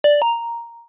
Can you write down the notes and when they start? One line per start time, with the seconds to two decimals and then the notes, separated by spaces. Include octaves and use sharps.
0.04 D5
0.22 A#5